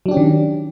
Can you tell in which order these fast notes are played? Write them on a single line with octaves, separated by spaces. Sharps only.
F#3 D4 G4 C#4 D#3